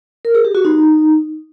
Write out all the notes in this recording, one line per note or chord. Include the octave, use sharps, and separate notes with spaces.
A#4
G#4
G4
F#4
D#4